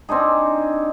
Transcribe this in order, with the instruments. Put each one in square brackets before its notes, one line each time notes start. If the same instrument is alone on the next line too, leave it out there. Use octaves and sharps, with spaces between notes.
[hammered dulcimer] C4 D4 D#4 G#4